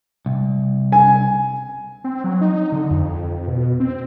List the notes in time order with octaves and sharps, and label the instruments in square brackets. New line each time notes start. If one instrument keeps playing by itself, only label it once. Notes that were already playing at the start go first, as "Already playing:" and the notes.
[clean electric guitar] C2
[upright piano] G#5
[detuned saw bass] C4
F#3
D#4
D3
F2
B2
C4